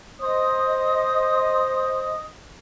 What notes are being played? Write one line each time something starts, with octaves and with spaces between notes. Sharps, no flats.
C5 D#5 D#6